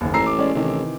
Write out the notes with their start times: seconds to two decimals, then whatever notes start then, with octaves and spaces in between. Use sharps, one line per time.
0.01 F#1 D#2
0.14 A1 A#5 E6 C7
0.27 D6
0.39 G#3 C#4 D5
0.55 A1 C3 D#3 E3